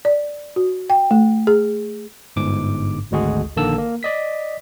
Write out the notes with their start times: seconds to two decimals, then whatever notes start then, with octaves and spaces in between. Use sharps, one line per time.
0.05 D5
0.56 F#4
0.90 G5
1.11 A3
1.47 G#4
2.36 G1 G#2 D6
3.11 G#1 D2 G#3 F#4 G#4
3.56 A#1 D3 D#3 A#3 A5 E6
3.78 A#3
4.03 D5 D#5 B6